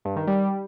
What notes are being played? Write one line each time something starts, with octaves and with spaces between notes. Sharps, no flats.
G2
D#3
G3